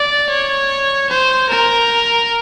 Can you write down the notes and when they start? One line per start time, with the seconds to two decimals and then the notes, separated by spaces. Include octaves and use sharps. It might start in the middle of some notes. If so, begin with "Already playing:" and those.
Already playing: D5
0.30 C#5
1.10 C5
1.49 A#4